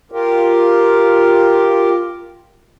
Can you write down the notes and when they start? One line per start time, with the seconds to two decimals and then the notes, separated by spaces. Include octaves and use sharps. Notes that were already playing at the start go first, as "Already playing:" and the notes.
0.12 F4 G4 A#4